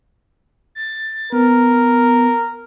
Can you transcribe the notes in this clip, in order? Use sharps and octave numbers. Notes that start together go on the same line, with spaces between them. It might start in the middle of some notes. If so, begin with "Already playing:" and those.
A6
B3 A#4